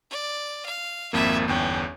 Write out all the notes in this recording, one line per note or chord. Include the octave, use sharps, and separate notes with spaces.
D5
F5
G#1 F2 A#3 E5 B5
G1 E2 C#4 G5